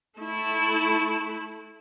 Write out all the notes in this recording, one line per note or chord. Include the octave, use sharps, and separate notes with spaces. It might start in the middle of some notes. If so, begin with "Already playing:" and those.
A3 E4